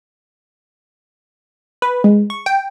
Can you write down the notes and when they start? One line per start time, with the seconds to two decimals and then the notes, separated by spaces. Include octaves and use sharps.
1.82 B4
2.04 G#3
2.30 C#6
2.46 G5